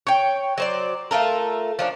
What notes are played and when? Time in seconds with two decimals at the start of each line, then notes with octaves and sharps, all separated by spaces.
0.07 C#5 G5
0.58 F#3 C5 D5
1.11 A3 F4 A4 A#4
1.79 F3 C#4 D4